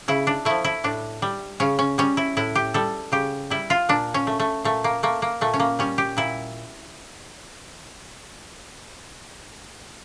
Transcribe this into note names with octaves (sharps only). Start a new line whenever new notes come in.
C#3 E4
D4
F3 A3 E4
E4
A2 D4
G3
C#3 C#4
C#4
G3 C#4
E4
A2 E4
G4
G3 A4
C#3 G4
G3 E4
F4
A#2 D4
C#4
A3
A3
A#2 A3
A#3
A3 A#3
A#3
A#2 A3
C#4
A#3
G3 C#4
G4
A#2 E4